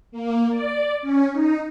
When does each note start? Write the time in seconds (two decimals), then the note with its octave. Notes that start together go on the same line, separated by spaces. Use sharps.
0.12 A#3
0.51 D5
1.02 C#4
1.33 D#4